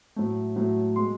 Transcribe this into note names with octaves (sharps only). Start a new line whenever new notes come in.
A2 F#3 A3
A2 F#3 A3
B2 G#3 C6